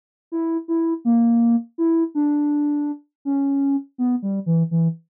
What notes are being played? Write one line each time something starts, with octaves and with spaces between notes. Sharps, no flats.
E4
E4
A#3
E4
D4
C#4
B3
G3
E3
E3